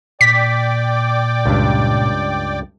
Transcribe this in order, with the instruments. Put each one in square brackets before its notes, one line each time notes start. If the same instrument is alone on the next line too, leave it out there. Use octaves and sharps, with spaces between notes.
[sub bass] A#2 [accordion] D5 G5 D6 [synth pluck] B6
[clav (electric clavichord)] C#2 G2